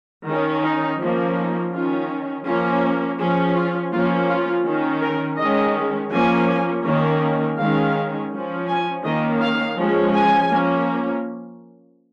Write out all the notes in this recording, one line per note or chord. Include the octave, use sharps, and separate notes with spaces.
D#3 C#4
D#4
F3 A#3 C#4
D#4
D#3 C#4 F4
F3 A#3 C#4 F4
F3 C#4 G#4
F4
F3 A#3 C#4 F4
F4
D#3 C#4
A#4
D#3 G#3 C#4 D#5
F3 A#3 C#4 G#5
D#3 A#3 C#4
D#3 G#3 C#4 F5
F3 C#4
G#5
D#3 A#3 C#4 D#5
F5
F3 G#3 C#4
G#5
F3 A#3 C#4